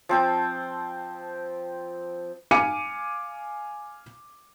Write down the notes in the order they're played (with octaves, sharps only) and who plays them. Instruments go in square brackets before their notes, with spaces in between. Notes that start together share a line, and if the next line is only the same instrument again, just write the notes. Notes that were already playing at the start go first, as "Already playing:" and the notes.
[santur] F3 C4 G5
[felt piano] F5 G#5 D6 C#7 D#7